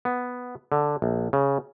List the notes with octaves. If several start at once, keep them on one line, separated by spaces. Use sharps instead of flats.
B3
D3
A#1
C#3